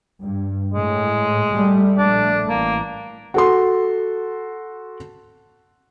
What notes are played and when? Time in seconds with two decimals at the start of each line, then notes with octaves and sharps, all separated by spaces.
0.21 G2
0.74 A2 G#3
1.54 G3 A3
1.98 A#1 A3 D4
2.49 A1 A#3
3.34 F#4 A4 C6